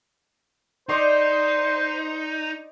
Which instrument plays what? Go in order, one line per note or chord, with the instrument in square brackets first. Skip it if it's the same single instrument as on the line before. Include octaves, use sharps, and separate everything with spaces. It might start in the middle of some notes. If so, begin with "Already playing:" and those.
[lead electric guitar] D#4 [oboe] C5 [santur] D5 D#5 C6